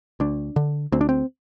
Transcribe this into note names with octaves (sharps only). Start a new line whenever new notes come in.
D2 D4
D3
D2 C4
D4
C4